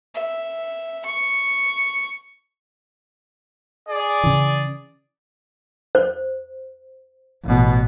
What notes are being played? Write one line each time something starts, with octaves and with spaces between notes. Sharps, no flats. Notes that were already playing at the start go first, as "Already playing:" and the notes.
E5
C#6
G#4 D5
C#3 E3
C5
A1 B2